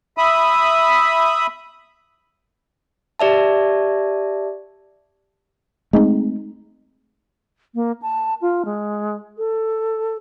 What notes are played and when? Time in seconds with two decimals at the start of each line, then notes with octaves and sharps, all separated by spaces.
0.17 E5 B5 D#6
3.20 G4 D5 E5 A5
5.93 G#3 A3 C4 D#4
7.75 A#3
8.02 A5
8.41 F4
8.65 G#3
9.38 A4